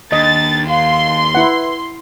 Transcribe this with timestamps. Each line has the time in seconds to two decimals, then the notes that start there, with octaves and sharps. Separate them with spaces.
0.12 D#2 D4 D#5 A6
0.69 F5 C6
1.35 E4 B4 F#5